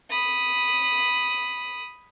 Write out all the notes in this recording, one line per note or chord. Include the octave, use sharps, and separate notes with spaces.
B5 D#6